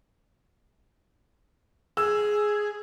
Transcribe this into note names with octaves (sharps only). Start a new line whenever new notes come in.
G#4 E6